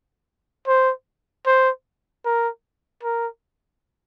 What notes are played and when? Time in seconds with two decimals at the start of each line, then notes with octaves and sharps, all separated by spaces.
0.68 C5
1.46 C5
2.25 A#4
3.03 A#4